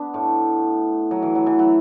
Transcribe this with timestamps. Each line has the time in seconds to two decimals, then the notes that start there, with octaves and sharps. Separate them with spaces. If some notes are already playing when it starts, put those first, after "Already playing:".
Already playing: B3 D4
0.14 A2 A3
1.11 F#3
1.22 E3
1.35 F#3
1.46 E3
1.59 F#3